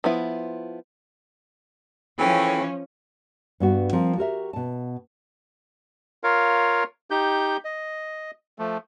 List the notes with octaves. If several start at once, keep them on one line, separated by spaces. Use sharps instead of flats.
F3 B3 E4
E3 F3 C#4 G#4 A4 G5
G2 B3 F#4
F3 C4 A#4
F#4 G4 A#4 E5
B2 A5
F4 A#4 C#5 F5
D#4 G4 G6
D#5
F3 A3